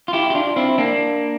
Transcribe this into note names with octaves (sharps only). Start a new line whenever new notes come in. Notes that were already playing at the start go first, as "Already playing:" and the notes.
F4
E4 G4
G4
D4 F4
C4 E4
A#3 D4